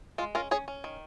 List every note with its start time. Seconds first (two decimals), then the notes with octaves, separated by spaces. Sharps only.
0.18 G#3 F4
0.35 C#4 F4 A#4
0.51 C#4 G#4 C#5
0.68 C#4
0.84 D#3